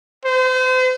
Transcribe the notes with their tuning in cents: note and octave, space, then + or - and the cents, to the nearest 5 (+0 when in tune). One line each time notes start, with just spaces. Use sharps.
C5 -35